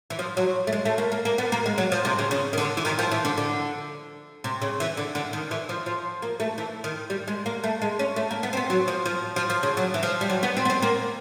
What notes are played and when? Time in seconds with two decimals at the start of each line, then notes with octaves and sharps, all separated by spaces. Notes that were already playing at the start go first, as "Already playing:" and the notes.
0.10 E3
0.19 F3
0.37 F#3
0.67 A3
0.73 G#3
0.85 A3
0.98 A#3
1.12 A#3
1.25 A#3
1.38 B3
1.52 A#3
1.66 G#3
1.78 F#3
1.92 F3
2.05 C3
2.19 C#3
2.31 C#3
2.53 D#3
2.58 D3
2.77 E3
2.85 D#3
2.99 F3
3.11 E3
3.25 D3
3.38 D3
4.44 C3
4.62 C#3
4.80 E3
4.97 D3
5.15 D3
5.33 D#3
5.51 E3
5.69 F3
5.86 F3
6.22 A#3
6.40 A3
6.58 E3
6.84 D#3
7.10 G3
7.28 G#3
7.46 A#3
7.64 A3
7.82 G#3
7.99 C#4
8.16 A3
8.31 A#3
8.43 B3
8.53 C4
8.57 B3
8.70 F#3
8.88 F3
9.06 F3
9.36 F3
9.50 F3
9.63 C#3
9.77 F#3
9.94 E3
10.03 F3
10.21 G3
10.30 F#3
10.43 B3
10.57 C4
10.65 B3
10.70 C4
10.82 A#3